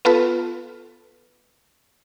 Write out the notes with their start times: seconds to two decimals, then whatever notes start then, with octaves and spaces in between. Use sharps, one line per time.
0.05 B3 F4 A4 B4